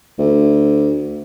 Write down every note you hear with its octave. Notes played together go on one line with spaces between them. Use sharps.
D2